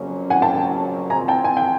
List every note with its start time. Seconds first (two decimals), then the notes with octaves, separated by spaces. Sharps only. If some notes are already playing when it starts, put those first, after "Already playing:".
Already playing: F2 C#3 F#3 A#3 C#4
0.30 F#5 G#5
0.42 G5 A5
1.10 F3 G#3 C4 G#5 A#5
1.28 G5 A5
1.44 G#5
1.57 G5